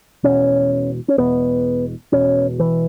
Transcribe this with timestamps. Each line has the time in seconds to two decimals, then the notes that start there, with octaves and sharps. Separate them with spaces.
0.23 E1 E2 B2 C#4
1.08 C#4
1.17 E1 E2 B2 B3
2.12 E1 E2 B2 C#4
2.60 E3